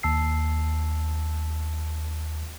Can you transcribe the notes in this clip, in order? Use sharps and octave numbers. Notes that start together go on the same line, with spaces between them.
D#2 A5 E6 C7